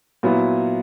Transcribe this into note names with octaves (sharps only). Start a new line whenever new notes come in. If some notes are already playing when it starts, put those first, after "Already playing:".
A#2 F#3 B3 E4